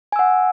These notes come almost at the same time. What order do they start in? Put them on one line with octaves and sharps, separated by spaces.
G#5 E6 F#5